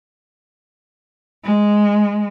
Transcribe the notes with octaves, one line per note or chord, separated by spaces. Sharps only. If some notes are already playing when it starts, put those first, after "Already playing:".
G#3